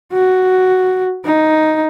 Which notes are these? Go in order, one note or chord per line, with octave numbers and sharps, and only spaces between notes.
F#4
D#4